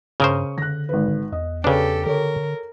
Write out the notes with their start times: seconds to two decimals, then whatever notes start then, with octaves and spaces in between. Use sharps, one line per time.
0.20 G2 C#3 A#4 C5 C#6 D#6
0.58 D3 F#6 A#6
0.89 G#1 B4
1.32 E2 D#5
1.64 C#3 D4 G4 A4 B4
2.06 D3 A4 A#4 C#5